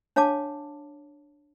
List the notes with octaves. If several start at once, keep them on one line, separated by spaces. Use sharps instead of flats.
D4 C#5 F5 A5 D6